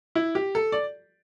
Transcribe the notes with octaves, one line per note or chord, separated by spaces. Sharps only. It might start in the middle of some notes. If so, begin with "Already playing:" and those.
E4
G4
A4
D5